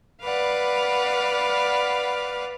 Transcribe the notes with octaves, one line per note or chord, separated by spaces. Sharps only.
B4 D5 F5 F#5 B5